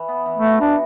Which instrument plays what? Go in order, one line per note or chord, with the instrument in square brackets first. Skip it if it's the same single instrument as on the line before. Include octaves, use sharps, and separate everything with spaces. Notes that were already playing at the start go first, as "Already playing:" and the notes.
Already playing: [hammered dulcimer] E3
B3
E3
[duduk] A3
[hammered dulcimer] F#4
[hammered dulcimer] E3 [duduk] D4